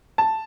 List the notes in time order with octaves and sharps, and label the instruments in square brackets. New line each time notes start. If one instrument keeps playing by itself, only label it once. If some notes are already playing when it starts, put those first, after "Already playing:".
[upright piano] A5